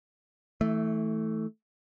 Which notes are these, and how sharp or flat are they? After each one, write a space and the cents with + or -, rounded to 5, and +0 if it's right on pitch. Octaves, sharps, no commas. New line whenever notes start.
E3 -25 A3 +0